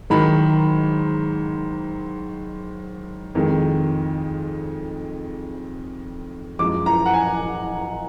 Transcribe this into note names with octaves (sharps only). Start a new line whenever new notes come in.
G#2 D#3 F#3 B5
F2 D#3 G#3
F#2 F3 G#3 D6
A#5
F#5
G#5